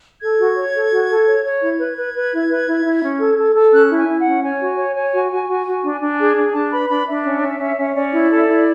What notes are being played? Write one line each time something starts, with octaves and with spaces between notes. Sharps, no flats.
A4 G#6
F#4
C#5
A4
F#4
A4
C#5
C#5
E4 G#6
B4
B4
B4
E4
B4
E4
E4
C#4
A4
A4
A4
C#4 F#6
E4
G#5
E4
F#5
C#4
C#5 G#5
F#4
C#5
C#5
F#4
F#4
F#4
F#4
D4
D4
G#4
D4
D4 A5
B4 B5
D4 B5
D4 E5
C#4
C#4
C#4
C#4
C#4 D5
E4
A4
E4